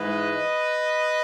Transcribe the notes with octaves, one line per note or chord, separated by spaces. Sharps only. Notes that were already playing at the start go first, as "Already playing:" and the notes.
Already playing: G#2 E3 G#3 B4 D#5